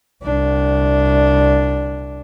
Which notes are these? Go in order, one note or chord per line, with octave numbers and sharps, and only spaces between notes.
C2 D4